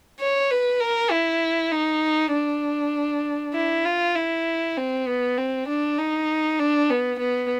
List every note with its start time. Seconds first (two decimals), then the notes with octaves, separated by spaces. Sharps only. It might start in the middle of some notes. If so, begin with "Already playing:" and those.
0.21 C#5
0.51 B4
0.81 A#4
1.11 E4
1.72 D#4
2.33 D4
3.54 E4
3.86 F4
4.16 E4
4.77 C4
5.07 B3
5.38 C4
5.69 D4
5.99 D#4
6.60 D4
6.90 B3
7.20 B3